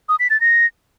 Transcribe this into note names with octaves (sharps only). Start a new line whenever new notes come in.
D#6
B6
A6
A#6